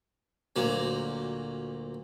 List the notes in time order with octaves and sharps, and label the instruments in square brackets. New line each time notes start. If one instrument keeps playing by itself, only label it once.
[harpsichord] D2 A#2 F#3